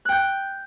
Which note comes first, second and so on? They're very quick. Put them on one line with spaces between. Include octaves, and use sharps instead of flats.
F#6 G5 G6